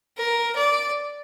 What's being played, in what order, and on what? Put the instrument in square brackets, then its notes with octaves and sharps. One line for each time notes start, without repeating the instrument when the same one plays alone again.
[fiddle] A#4
D5